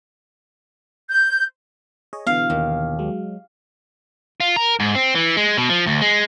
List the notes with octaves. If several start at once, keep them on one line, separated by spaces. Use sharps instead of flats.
G6
G#4 C#5 D#5
B2 D3 E3 F5
D#2
F#3 G#3
F4
A#4
G#2
C4
E3
G#3
B2
F3
D2
G#3